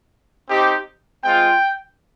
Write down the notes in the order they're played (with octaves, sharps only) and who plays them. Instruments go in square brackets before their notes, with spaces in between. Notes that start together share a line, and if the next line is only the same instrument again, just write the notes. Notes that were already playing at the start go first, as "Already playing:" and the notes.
[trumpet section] C4 D#4 G4
G#3 C4 F4 G5